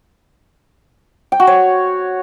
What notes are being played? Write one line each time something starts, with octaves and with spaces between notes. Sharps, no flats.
G5
F#4
C#5